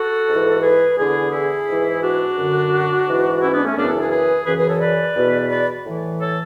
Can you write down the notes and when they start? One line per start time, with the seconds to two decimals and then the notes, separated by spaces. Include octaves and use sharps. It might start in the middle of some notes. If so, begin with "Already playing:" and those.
Already playing: F#4 A4
0.28 G#2 E3
0.62 G#4 B4
0.97 E2 D3 E4 G#4
1.32 E4 G#4
1.67 G#2 E3
2.02 D4 F#4
2.37 F#2 D3
3.06 G#2 E3
3.41 C#4 E4
3.52 B3 D4
3.65 A3 C#4
3.76 F#2 C#3 E3 B3 D4
3.88 A4 C#5
3.99 G#4 B4
4.10 G#4 B4
4.45 F#2 C#3 E3 G#4 B4
4.57 G#4 B4
4.68 A4 C#5
4.80 B4 D5
5.15 E2 B2
5.49 B4 D5
5.85 A2 E3
6.19 A4 C#5